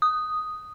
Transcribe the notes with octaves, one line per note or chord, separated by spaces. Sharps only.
D#6